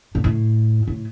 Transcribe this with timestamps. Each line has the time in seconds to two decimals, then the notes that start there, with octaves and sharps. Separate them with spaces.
0.15 A#2
0.24 A2
0.87 A2